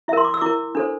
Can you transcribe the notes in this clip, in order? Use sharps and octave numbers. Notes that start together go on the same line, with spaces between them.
E4 A#4 E5 C6
D6
E6
E4 A#4 D6
D4 A4 C5